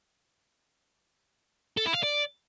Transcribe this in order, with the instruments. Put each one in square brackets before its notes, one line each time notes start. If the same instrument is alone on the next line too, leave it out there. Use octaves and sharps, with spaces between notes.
[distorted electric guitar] A4
E4
F5
D5